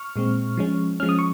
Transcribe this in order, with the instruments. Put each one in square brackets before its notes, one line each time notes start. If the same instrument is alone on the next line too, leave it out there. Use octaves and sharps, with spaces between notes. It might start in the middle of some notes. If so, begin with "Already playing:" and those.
Already playing: [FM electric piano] C#6 F6
A#2 G#3 C4
F3 G#3 C#4
F3 G#3 C#4 F6
D#6
C#6